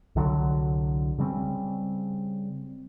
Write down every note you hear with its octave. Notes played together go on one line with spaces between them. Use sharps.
C2 D3 D#3 F#3
C#3 G3 A3 C4